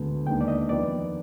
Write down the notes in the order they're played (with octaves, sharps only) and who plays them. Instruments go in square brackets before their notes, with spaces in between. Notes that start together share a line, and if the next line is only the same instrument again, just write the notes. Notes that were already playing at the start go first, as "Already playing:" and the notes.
Already playing: [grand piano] D2 D3 G#3 B3
[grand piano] D#2 D#3 G#3 B3 D4 [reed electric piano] G5
[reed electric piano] D5
D#5
[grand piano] F2 D#3 B3 D#4 [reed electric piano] D5